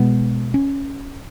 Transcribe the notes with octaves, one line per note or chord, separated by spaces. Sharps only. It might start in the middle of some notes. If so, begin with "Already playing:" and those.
Already playing: B2 G#3 B3
C#4